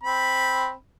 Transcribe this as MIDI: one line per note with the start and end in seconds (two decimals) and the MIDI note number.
0.03 0.72 60
0.03 0.72 83